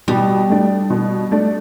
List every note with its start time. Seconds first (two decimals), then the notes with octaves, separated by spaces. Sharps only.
0.08 B2 G3
0.50 A3 D4
0.90 B2
1.31 A3 D4